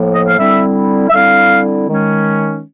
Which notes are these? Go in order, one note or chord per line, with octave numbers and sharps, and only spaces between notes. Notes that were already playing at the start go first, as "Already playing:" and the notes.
Already playing: A2 F3 A#3
D#5
F5
D3 G3 C4 E4 E5
E5
D3 G3 C4 E4 F5
D#3 G#3 C#4